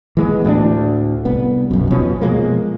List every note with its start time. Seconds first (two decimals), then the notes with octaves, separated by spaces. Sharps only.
0.17 E3 G#3 B3
0.45 D2 A2 C#4 D4
1.25 C2 B3
1.71 B1 F#2
1.91 F#1 B2 F3 C#4
2.21 B2 F3 G#3 A#3